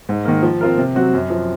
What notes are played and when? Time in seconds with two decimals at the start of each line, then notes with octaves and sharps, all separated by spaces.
0.09 G#2
0.25 D#3 A#3
0.43 F3
0.61 C4 F4 A#4
0.77 C3
0.95 F#3 C4 F#4
1.13 F#2
1.30 F3 C4